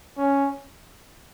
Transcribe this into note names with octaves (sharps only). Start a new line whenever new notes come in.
C#4